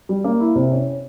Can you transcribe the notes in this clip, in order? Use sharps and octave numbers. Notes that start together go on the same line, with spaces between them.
G3
A#3
E4
C3
C#4